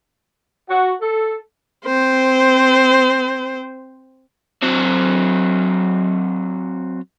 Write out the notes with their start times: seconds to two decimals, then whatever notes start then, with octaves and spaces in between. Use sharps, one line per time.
0.69 F#4
1.01 A4
1.85 C4 C5
4.62 F#3 C4